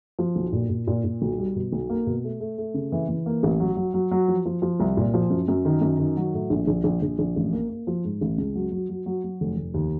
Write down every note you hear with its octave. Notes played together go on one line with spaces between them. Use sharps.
F3
B1
A#2
A#2
A#2
A#2
B1
G3
B2
B1
A#3
B2
A3
A3
A3
C#3
E3
E3
A#3
A1
F#3
F#3
F#3
F#3
F3
F3
F3
C2
A#2
F3
F#2
F#2
D#3
F#2
D#3
F#3
A2
A#1
A#1
A#1
A#1
A#1
A1
A#3
A#3
F3
G#2
A1
C#2
F#3
F#3
F#3
F#3
F#3
F1
F1
D#2